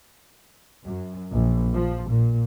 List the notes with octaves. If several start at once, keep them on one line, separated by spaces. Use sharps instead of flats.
F#2
A#1
F3
A#2